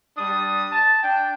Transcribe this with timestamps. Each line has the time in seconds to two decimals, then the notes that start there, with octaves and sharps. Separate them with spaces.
0.17 G3 D4 D#6
0.71 A5
1.02 D4 G5